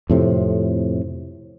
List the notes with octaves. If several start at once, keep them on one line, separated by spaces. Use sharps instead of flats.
F2 A2 C3